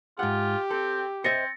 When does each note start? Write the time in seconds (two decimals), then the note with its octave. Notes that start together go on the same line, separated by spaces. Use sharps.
0.19 G#2 F4 G4 F#5
0.71 C4 A4
1.24 C4 C5 D#5 E5 A6 A#6 C#7